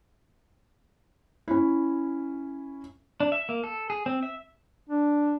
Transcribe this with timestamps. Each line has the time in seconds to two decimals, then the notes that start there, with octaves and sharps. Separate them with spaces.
1.48 C#4 E4
3.20 D4
3.32 E5
3.49 A#3
3.64 A4
3.90 G#4
4.06 C4
4.23 E5
4.89 D4